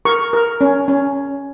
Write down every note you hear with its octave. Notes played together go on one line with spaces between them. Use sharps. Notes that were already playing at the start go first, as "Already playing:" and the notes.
A#4 C#6
A#4
C#4
C#4